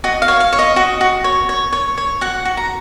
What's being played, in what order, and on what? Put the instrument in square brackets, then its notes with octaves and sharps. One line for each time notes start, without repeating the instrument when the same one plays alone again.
[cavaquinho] F#4 D#5
F5
C#5
F5
C#5
D#5
F#4 D#5
F#4
C#5
C#5
C#5
C#5
F#4 F#5
F#4
A#5